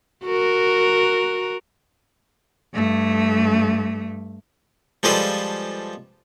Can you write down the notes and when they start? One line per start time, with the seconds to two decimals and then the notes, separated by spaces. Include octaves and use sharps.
0.25 F#4 A#4
2.74 G2 A3
5.03 F3 G3 G#3 F4 A4 B4